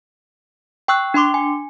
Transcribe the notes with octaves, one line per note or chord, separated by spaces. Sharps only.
G5 C#6 E6 F#6
D4 G5 C6 D6
G#5